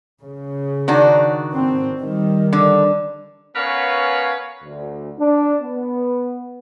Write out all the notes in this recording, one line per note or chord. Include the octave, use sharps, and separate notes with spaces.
C#3
D#3 D4 F#4
C4
D#3 G3
D3
B3 C#4 A#4 B4 C#5 F5
D2
D4
B3